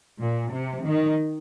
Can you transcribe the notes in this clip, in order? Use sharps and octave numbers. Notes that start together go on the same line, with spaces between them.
A#2
C3
D#3